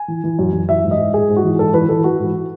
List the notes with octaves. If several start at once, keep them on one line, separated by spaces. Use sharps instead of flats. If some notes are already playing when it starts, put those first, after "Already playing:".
Already playing: G#5
E3
E3
F#2
F#2
E3 E5
G#2
D#5
G#2
G#2 G#4
G#2
F#4
E3
G#2 A4
E3 B4
E3 A4
E3 F#4
G#2